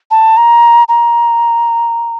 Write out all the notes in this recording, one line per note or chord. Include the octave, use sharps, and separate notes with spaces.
A5
A#5
A#5